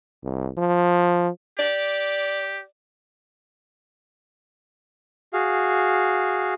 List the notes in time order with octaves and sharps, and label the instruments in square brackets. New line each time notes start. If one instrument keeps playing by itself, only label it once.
[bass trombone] C2
F3
[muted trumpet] G4 [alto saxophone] D5
[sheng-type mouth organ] F#4 G#4 F5